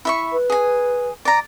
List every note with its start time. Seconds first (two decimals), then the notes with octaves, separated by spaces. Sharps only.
0.05 E4 E5 C#6
0.32 B4
0.50 G#4 G#5
1.25 D5 A#5